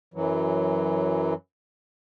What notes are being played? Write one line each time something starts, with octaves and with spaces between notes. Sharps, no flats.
F#2 E3 F#3